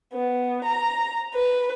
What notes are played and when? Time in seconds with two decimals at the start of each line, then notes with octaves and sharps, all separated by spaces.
0.12 B3
0.64 A#5
1.33 B4